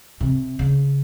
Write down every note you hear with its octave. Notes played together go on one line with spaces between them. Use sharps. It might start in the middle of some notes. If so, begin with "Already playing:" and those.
C3
C#3